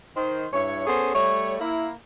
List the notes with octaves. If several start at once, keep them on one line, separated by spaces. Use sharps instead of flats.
D#3 C5
G2 E4 C#5
B3 C#4 G#4 A4 C5
G3 A3 C#5
A#3 E4